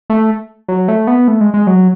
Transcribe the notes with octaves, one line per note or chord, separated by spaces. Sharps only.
A3
F#3
A3
B3
A3
G#3
G#3
F#3